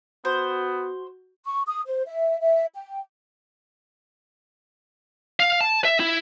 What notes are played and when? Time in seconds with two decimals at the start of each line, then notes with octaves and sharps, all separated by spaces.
0.25 B3 F#4 C5
1.45 C#6
1.67 D#6
1.86 C5
2.06 E5
2.41 E5
2.74 G5
5.40 F5
5.61 A5
5.85 E5
6.00 E4